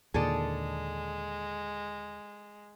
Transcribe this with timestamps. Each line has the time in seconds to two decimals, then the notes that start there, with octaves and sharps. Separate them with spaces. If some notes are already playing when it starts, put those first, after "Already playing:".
0.14 D#2 A#2 D3 G#3 G#4 A4 D5